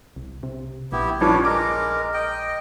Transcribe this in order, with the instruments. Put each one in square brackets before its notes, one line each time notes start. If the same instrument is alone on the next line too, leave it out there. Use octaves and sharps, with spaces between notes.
[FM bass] C2
C3
[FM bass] A#1 [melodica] B3 E4 G4
[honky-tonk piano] G2 F3 C#4 [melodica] D4 B4 C#5
[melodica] G#3 A#4 [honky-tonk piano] D6
[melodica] D#5 G5